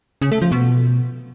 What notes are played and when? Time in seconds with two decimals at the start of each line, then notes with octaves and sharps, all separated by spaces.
0.22 C#3
0.32 A3
0.42 F3
0.52 B2